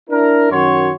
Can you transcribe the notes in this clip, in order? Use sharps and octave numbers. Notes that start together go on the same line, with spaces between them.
D4 E4 A#4
F#2 D#3 F#4 C#5 C6